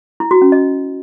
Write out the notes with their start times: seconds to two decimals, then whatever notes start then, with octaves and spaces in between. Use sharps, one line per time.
0.20 E4
0.31 F#4
0.42 C#4
0.52 D#5